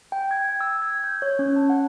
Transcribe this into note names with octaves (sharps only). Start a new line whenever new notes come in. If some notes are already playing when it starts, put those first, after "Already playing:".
G5
G#6
E6
G#6
G6
C#5
C#4
A5
F#5